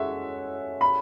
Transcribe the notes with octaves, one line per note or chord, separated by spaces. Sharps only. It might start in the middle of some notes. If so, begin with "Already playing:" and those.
Already playing: G#3 C#4 F#4 A4 E5
B5